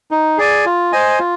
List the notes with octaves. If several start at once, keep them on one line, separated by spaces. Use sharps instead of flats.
D#4
G#4 D5 G#5
F4
C5 D#5 G#5
F4